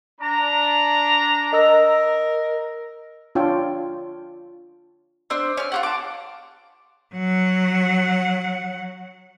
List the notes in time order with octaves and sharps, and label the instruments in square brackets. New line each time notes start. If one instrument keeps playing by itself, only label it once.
[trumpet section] D4 A#5
[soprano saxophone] A#4 [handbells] D#5 E6
[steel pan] D4 F4 C#5 G5
[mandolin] D4 C5 E6
C#4 F6
F4 G4 F#5
A5 D6
[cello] F#3 F#5